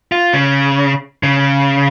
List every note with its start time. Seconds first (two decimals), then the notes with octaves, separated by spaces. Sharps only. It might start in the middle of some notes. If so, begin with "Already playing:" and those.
0.12 F4
0.33 C#3
1.23 C#3